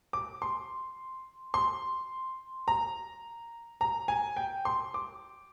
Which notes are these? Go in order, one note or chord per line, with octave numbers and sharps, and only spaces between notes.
D6
C6
C6
A#5
A#5
G#5
G5
C6
D6